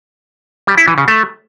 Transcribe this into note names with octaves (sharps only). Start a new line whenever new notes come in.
G3
E4
E3
C#3
A3